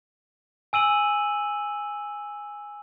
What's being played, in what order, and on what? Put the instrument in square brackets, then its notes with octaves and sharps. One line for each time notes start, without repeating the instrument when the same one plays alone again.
[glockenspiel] G#5 E6 D#7 F#7